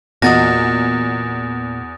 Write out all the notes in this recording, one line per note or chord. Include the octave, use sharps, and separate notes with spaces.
E2 A#2 F#4 D#5 F#5 D#6 A6 A#6